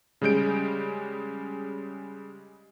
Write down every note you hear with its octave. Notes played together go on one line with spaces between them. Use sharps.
C#3 G3 G#3 G6 D7